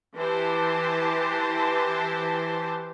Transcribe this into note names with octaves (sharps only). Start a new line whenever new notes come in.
E3 G4 C5 A5